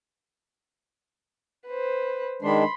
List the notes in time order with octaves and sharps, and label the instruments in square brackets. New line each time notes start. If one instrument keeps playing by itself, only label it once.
[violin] B4 C5
[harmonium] D#3 G#3 D4 [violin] B5 C6